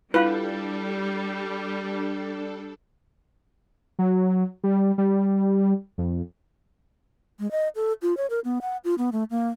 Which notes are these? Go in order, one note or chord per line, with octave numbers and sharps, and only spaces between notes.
G3 D4 E4 F4 A4 B4 F5
F#3
G3
G3
F2
G#3
D#5
A4
F4
C#5
A#4
B3
F#5
F4
B3
A3
A#3